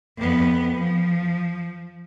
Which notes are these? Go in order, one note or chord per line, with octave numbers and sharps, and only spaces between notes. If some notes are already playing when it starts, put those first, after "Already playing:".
F2 B3
F3